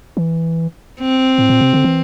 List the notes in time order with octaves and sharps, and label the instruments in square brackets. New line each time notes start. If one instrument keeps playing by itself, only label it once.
[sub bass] E3
[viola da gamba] C4
[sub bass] A2
A#2
C3
D3
E3